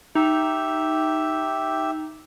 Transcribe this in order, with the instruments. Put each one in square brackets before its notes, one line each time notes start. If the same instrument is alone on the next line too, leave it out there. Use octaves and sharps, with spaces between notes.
[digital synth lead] D#4 [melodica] G4 E5